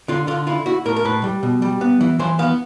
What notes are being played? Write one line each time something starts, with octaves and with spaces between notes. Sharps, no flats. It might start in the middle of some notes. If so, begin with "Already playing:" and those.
D3 F4
D3 F4
E4 F4
E4 F#4
A2 A#4
A#4
A2 B4
G3
B2
G3
B3
E3
E3 C5
B3 F5